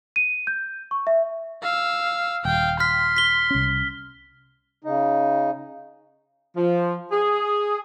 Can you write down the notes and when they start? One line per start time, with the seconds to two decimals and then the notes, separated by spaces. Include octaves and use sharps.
0.16 D#7
0.47 G6
0.91 C#6
1.07 E5
1.62 F5 E6
2.45 D#1 F5 G5
2.80 C6 F6 B6
3.16 B6 G7
3.50 C2 C#4
4.84 C#3 D#4
6.55 F3
7.11 G#4